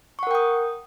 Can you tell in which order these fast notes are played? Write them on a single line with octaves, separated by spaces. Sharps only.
C#6 F#5 A#4 G5 D#6